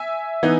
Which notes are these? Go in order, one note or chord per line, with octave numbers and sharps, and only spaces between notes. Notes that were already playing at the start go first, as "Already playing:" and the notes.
Already playing: E5 G#5
E3 B3 D#4